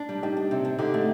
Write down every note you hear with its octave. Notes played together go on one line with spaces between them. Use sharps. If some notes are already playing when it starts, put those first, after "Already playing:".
Already playing: D4
G3
G3 D#4 G4
D4
C3
D4
D3 D#4 G4
A3